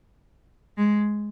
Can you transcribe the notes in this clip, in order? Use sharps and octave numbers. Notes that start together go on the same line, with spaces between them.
G#3